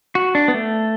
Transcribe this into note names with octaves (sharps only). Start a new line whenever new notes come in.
F#4
D4
B3
A3